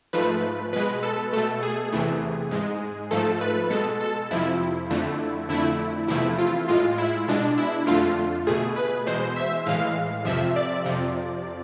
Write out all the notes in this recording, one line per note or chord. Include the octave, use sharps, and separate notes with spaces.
G#2 F3 A3 B4
B2 G#3 B4
A4
B2 A3 A4
G#4
E2 C3 E3 A3
G#2 G#3
G#2 F3 A3 A4
B4
B2 G#3 A4
A4
F2 C3 F3 E4
F2 D3 A3
F2 D3 A3 E4
E2 C3 F3 A3 E4
F4
A2 G#3 F4
E4
B2 G#3 D4
E4
F2 D3 A3 F4
B2 A3 G#4
B4
E2 B2 G#3 C5
E5
A2 E3 G#3 F5
F2 C3 F3 E5
D5
F2 C3 F3